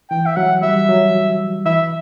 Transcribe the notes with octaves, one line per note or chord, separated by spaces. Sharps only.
E3 G5
E5
F#3 F#5
G3 E5
F#3
E3 E5